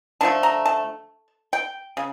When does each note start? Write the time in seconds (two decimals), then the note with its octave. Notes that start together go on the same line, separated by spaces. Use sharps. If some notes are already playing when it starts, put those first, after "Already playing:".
0.21 D3 F3 A3 A5
0.43 A#5
0.66 A5
1.53 G5
1.97 C#3